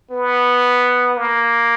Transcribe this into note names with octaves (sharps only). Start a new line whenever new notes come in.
B3
A#3